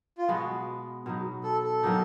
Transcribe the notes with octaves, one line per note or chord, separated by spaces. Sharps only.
F4
B2 G#3 B3 F#4
B2 F#3 B3 D#4
A4
A4
D#3 F#3 A#3 D#4